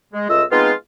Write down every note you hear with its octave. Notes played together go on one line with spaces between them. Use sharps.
G#3
C#2 A3 F4 D#5 E6
G#3 B3 C4 D#4 F4